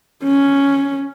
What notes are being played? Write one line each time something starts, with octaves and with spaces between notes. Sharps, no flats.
C#4